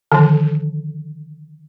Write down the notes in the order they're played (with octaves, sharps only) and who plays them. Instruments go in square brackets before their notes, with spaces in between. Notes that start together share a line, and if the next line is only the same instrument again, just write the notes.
[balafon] D3 D#3 F3